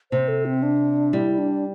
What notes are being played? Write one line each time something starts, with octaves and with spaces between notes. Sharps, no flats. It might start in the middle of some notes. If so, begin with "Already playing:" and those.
C3 C5
A4
C4
D4
G3 E4
D4